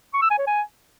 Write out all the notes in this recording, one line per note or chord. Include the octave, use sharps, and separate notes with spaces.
C#6
E6
G#5
C#5
G#5